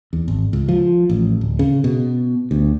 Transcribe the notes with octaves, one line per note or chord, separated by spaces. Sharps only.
E2
G#1
C#2
F3
A1
D1
C#3
B2
D2